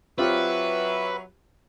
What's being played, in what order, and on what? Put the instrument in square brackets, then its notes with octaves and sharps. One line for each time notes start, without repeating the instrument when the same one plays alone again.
[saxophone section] F#3 E5 [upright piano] C4 F4 G4 [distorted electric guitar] B4